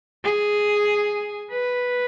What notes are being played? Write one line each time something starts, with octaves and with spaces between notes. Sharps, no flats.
G#4
B4